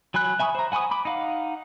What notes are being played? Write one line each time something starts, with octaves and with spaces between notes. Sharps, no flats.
F#3 G#5 B5 F#6
E5 G#5 B5 C#6 D#6
C5 A#5
F#5 G#5 B5 C#6 D#6
B5 D6
D#4 F5 F#5